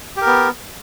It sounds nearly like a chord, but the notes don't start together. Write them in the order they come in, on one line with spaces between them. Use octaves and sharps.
G4 A#4 B3